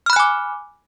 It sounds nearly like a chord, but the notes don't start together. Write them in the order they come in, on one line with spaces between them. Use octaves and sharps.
F6 B5 F#6 G#5 D6